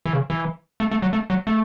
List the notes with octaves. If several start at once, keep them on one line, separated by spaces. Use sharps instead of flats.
E3
C#3
E3
A3
A3
F#3
A3
F#3
A3